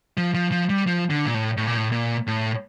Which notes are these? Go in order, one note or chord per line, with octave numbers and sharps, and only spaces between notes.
F3
F3
F3
G3
F3
D3
A#2
A2
A2
A#2
A2
A#2
A2